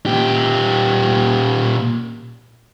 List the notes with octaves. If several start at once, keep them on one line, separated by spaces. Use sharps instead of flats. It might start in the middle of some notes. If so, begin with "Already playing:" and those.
A#2 G4